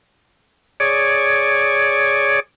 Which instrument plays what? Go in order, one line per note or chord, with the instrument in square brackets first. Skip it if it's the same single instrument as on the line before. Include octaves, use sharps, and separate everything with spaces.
[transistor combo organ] G#4 C#5 D5